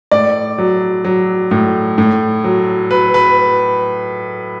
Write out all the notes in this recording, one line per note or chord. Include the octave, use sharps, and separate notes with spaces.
A2 D5
F#3
F#3
A2
A2
F#3
F#3 B4
B4